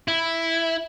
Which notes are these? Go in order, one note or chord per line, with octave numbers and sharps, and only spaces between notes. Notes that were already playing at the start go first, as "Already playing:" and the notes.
E4